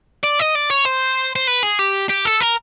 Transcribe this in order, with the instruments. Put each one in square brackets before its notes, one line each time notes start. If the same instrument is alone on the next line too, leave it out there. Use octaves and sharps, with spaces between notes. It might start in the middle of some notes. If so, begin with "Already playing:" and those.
[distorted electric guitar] D5
D#5
D5
C#5
C5
C5
B4
G#4
G4
G4
A4
A#4